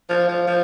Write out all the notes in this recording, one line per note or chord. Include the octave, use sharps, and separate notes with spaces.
F3
F3
F3